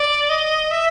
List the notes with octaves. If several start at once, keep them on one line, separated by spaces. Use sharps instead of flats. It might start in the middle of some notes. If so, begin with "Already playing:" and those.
Already playing: D5
D#5
E5